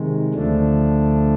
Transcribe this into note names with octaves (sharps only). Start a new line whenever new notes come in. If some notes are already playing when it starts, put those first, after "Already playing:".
Already playing: C3 D#3 G#3
D2 D3 F3 A3 D4